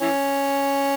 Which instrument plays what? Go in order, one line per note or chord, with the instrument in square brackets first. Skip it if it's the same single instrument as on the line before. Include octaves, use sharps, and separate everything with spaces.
[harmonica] E3 C#4